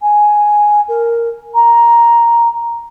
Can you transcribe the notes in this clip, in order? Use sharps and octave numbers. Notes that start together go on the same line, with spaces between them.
G#5
A#4
A#5